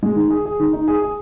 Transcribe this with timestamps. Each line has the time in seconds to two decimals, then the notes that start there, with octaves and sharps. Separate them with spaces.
0.03 G#3
0.16 D#3
0.30 G#4
0.46 G#4
0.60 D#3
0.73 D#4
0.88 G#4
1.02 G#4